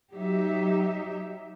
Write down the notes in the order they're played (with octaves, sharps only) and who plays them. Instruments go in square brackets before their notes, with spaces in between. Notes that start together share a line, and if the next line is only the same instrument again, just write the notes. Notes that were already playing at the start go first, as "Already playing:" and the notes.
[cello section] F#3 D#4 G4 E5